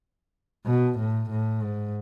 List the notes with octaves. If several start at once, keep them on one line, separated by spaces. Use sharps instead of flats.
B2
A2
A2
G#2